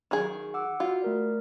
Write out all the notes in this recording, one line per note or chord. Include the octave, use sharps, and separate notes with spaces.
D#3 F#3 G#4
F#5 D6 E6
F4 F#4
A3 A#4 D5